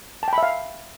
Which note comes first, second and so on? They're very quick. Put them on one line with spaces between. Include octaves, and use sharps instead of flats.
A5 G5 B5 E5 F5